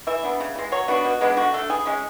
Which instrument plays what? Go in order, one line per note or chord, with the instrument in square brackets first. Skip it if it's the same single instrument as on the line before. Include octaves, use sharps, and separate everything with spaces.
[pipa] E3 E5
B3 D4
C#3
E3 G#3
F#3 C#5
B3 D4 F#4
B2
G#3 B3 D4
D3 F#4
A3 D4 A4
E3 G#4
G#3 C#4